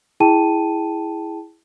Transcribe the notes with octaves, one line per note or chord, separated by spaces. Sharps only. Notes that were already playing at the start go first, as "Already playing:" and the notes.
E4 G#4 G5 A5 D#7